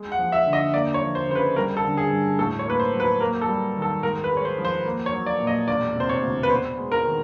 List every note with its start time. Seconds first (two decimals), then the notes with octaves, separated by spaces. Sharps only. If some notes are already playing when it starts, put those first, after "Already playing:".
Already playing: G#3
0.12 F#5
0.19 F3
0.32 E5
0.46 D3
0.53 D#5
0.74 A#3 D5
0.94 C#5
1.01 F3
1.15 C5
1.29 C#3 C5
1.35 B4
1.56 G3 A#4
1.77 A4
1.84 D3
1.97 G#4
2.11 G2
2.38 A2 A4
2.59 C#5
2.66 A#3 B4
2.80 C5
2.94 F#3
3.00 B4
3.21 A#3 A#4
3.41 A4
3.48 G3
3.75 D#3
3.82 A4
4.03 G#2 A#4
4.24 B4
4.31 G#3
4.37 C#5
4.45 C5
4.58 F3
4.65 C5
4.85 A#3
5.06 C#5
5.13 F#3
5.26 D5
5.40 A#2
5.47 D#5
5.67 E1 D5
5.95 C3 C5
6.09 C#5
6.22 D2
6.43 B4
6.50 B3 C5
6.77 G#3
6.92 A#4
7.05 D#3